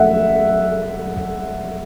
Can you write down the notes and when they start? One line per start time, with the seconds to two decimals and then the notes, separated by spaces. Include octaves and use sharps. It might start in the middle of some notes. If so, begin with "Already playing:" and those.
Already playing: E5 F#5